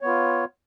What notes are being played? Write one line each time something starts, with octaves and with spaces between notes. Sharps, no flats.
B3 F4 C#5